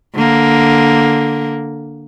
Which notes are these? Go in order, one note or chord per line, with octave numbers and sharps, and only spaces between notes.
D3 A#3